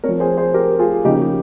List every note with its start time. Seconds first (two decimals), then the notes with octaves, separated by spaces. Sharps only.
0.04 C4 A#4 C#5
0.09 F3
0.20 G#4 C5
0.37 G#4 C5
0.54 G4 A#4
0.79 F4 G#4
1.05 C#3 F3 A#3 C#4 D#4 G4
1.22 G4